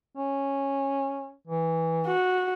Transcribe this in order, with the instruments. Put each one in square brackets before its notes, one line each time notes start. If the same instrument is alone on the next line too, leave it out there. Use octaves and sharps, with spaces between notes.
[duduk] C#4
E3
[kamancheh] F#4